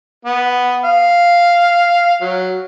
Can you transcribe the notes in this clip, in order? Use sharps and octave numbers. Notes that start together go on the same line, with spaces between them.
B3
F5
F#3